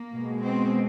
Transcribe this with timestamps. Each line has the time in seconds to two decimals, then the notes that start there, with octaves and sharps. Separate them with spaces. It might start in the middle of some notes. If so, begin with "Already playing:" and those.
Already playing: A#3
0.14 B2 G#3
0.45 C4